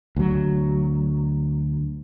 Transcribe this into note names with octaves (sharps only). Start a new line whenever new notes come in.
D2 F#3